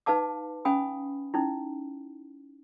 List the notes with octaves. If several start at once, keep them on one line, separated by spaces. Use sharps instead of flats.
D#4 B4 F5 A5 D6
C#4 F5 G#5 B5 D#6
C#4 D#4 E4